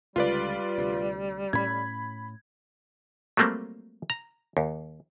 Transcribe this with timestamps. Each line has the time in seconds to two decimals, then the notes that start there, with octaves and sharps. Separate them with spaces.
0.16 C#2 D3 G3 F4 B4 D5
0.78 D2 C3
1.53 A2 C#4 B5 G#6
3.37 F#3 G3 A3 A#3 C4
4.10 A#5
4.57 D#2